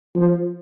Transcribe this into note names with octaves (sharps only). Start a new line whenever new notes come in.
F3